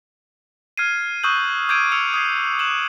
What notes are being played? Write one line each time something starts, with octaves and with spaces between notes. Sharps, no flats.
F6 G#6 C7 D#7
C#6 D#6 E6 F#6 G6 F#7
D6 G6 G#6 D7 D#7
E6 C#7 F7
D#6 G#6 C7
F#6 E7 F#7